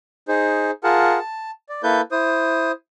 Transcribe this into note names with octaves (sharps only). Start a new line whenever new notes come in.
D#4 G#4 C5
F4 G#4 A#4 F#5 A5
A5
D5
A#3 E4 A4 B4 G6
E4 C5 D#6